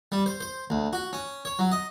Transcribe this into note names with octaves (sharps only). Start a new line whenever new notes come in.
G3
C5
C5
D2
F#4
C#4
C#5
F#3
D#5